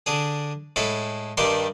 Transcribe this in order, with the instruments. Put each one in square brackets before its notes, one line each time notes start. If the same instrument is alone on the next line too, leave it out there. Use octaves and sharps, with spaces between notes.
[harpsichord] D3 D4 G#4
A2 G#3 A4 B5
G2 D#3 G3 D4 D5 C6